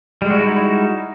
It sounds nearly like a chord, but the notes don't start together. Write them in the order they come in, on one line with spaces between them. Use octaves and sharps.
G3 G#3 F#4 E4 D#4